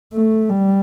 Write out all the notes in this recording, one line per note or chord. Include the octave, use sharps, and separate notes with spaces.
A3
G3